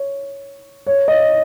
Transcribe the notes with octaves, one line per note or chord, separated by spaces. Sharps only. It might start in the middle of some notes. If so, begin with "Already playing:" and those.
Already playing: C#5
C#5
D#5